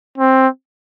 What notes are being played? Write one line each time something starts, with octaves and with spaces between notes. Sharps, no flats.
C4